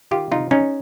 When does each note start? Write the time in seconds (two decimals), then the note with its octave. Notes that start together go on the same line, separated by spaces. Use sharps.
0.11 D#3 F4 G4
0.31 C3 D#4 F4
0.51 G#3 C#4 D#4